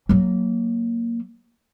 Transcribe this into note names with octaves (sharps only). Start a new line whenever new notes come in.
F#3 A#3